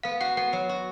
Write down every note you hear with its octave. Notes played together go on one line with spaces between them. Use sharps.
B3 F5
F#4 F#5
B3 F#5
F#3
F#4